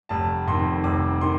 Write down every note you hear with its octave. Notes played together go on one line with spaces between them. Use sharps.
F1 A5
F2 D#3 C6
F1 D6
D#3 C6